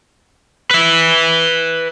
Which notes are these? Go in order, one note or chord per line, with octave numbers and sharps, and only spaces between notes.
B4 E5